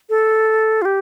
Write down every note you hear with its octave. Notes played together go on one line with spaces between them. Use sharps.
A4
F4
G4